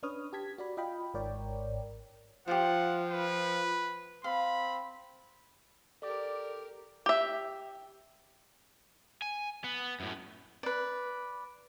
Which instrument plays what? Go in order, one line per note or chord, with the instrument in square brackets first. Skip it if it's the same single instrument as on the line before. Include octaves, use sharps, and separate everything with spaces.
[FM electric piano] C#4 D4 B4 C#5 D#6 F6
G4 A5 G#6 B6
F#4 D5 B5
F4 D#5 F5 G5 B5
G#1 G#2 A#4 C#5 D5 G5
[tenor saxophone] F3 [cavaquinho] F4 G4 [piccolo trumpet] F#5
[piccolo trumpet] B4
[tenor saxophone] C4 [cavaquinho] F5 [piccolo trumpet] B5
[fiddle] G4 A#4 [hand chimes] A4 D6 [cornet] D5
[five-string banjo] G4 E5
[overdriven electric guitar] G#5
B3
F#2 A2
[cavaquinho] B4 D5